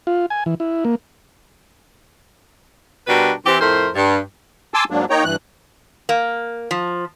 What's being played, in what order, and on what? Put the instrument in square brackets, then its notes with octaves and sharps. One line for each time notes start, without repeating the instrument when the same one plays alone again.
[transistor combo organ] F4
G#5
E3
E4
A#3
[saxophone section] B2 G3 D4 F#4 A#4 B4
E3 C4 G4
F2 A2 A3 A#4 C5
G2
[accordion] G#5 A5 C6 D6 E6
G#2 F#3 A#3 D4
A#3 D#4 C#5 G5 A#5
G2 E3 F#6
[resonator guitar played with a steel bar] A#3
F3